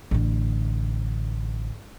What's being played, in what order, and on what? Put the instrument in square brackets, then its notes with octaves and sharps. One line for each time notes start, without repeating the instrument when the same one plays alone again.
[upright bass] A1 D3